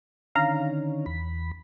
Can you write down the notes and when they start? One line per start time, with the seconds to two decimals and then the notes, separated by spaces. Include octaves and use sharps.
0.35 D3 D#3 C#4 F5 A#5
1.06 E2 B5